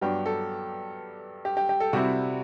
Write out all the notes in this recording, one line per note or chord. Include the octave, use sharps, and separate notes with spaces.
G2 F#3 B3 D4 G4
A4
G4
G4
G4
A4
C3 G3 C4 E4 F#4